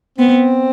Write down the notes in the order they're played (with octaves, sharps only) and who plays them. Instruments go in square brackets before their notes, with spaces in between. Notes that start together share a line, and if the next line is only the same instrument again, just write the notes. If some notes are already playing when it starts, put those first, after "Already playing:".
[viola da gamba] B3 [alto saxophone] C4